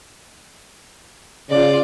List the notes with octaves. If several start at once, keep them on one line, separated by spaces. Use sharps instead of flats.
C#3 F4 D5